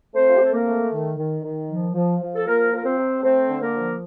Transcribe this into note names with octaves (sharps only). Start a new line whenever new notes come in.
A3 C4 C5
F4
G4
C4
A4
A#3 A#4
A3
D#3
D#3
D#3
F3
F3
F3
A4
F3 A#3 A#4
F3 A#4
C4 C5
C3
A3 C4 C5
D3
A#3 A#4
F3